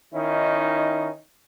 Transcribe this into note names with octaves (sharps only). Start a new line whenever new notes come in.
D#3 C#4 D#4 E4